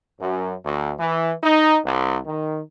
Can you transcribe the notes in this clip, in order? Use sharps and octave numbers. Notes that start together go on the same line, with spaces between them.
F#2
D2
E3
D#4
C2
D#3